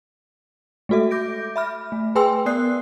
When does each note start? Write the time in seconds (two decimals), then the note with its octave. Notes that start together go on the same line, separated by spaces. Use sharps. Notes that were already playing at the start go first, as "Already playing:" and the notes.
0.89 G#3 A3 F#4 A4 E5
1.11 D6 G6 A#6 D7
1.56 E5 B5 F6
1.92 A3
2.15 G#4 B4 G5 G#5 C6 E6
2.46 B3 A#4 D5 D#6 F#6 C7